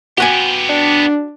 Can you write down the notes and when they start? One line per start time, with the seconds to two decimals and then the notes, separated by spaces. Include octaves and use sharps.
0.18 B3 F#4 G4 F#5 G#5
0.69 D4